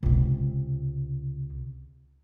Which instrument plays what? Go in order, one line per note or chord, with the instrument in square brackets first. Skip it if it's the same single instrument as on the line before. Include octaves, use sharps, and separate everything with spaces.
[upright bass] C#2 C3